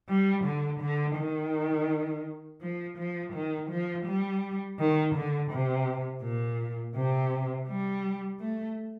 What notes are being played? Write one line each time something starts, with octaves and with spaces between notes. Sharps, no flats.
G3
D3
D3
D#3
F3
F3
D#3
F3
G3
D#3
D3
C3
A#2
C3
G3
A3